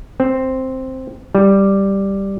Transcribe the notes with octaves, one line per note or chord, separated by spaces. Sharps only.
C4
G3